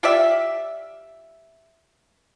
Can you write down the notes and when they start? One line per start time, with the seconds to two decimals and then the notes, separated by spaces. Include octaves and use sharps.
0.03 F4 G4 D5 E5